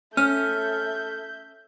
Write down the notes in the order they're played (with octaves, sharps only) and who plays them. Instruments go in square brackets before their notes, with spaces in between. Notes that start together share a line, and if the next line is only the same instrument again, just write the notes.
[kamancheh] A3 [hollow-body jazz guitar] C#4 [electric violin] E5 G6 [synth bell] F6